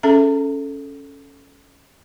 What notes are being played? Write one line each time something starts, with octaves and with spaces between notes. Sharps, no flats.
C#4 G#4 A4 E5 A#5